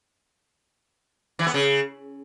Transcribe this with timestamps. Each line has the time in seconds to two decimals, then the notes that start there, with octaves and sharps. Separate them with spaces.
1.39 E3
1.47 B3
1.54 C#3